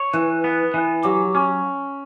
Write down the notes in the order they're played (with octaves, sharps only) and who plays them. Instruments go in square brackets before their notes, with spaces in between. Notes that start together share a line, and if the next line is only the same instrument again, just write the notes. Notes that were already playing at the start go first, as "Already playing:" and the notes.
Already playing: [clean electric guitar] C#5
[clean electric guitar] E3 [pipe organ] B4
[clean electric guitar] B3
E3
[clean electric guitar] F#3 [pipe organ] G4
[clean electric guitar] C#4